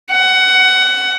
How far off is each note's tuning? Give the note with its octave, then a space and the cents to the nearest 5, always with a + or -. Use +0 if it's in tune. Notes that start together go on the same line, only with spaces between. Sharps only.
F#5 +20